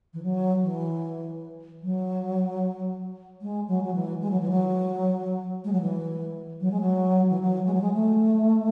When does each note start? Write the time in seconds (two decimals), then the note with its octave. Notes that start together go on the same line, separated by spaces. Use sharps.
0.14 E3
0.23 F#3
0.63 E3
1.83 F#3
3.42 G#3
3.68 F#3
3.84 F#3
3.94 E3
4.22 G#3
4.31 F#3
4.40 E3
4.50 F#3
5.64 G#3
5.72 F#3
5.81 E3
6.60 F#3
6.71 G#3
6.81 F#3
7.30 E3
7.41 F#3
7.66 G#3
7.74 F#3
7.81 G#3
7.93 A3